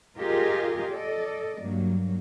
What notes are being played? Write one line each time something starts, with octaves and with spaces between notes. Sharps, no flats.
F4 G4 G#4 A#4 D#5
A4 D5 D#5
G2 F#3 A#3